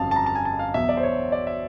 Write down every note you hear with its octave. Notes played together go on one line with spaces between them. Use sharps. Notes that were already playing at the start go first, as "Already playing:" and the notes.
Already playing: G1 F2 C#3 F#3 F5 A5
A5
A#5
A5
G#5
A5
F5
E2 B2 F#3 E5
D5
C5
C#5
D5
E5